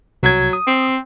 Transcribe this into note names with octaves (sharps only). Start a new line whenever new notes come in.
C2 F#3 G#6
D#6
C4